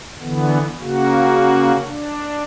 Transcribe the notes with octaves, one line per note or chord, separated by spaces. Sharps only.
D3 E3 B3
C#3 A#3 F#4
D4